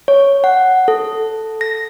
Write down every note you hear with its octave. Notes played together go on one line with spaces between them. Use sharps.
C#5
F#5
A4
A#6